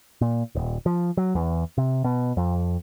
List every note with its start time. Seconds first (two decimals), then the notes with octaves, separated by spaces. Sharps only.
0.21 A#2
0.55 D#1
0.86 F3
1.17 F#3
1.35 E2
1.78 C3
2.04 B2
2.37 F2